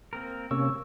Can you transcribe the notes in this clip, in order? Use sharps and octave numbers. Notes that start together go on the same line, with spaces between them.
A#3 C4 A#4
C3 A#3 C#4 C#6 E6